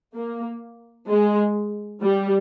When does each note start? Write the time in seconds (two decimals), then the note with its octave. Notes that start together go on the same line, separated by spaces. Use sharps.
0.15 A#3
1.09 G#3
2.02 G3